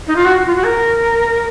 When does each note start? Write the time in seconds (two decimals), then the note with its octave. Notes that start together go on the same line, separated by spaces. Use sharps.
0.07 D#4
0.15 F4
0.25 F#4
0.45 F4
0.55 F#4
0.64 A#4